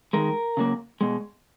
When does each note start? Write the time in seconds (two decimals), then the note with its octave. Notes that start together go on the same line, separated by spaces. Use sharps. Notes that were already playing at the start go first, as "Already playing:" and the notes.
0.13 D#3 G#3 A#4
0.57 C#3 F#3 A#3
1.01 B2 G#3